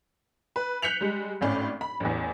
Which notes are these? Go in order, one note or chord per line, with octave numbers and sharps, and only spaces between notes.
B4
F#6 G6 B6 C#7 F7 F#7
G3 G#3
G#1 A2 C#4 D5
B5
A1 E2